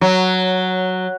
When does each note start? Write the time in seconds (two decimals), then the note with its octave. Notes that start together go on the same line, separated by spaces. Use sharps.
0.01 F#3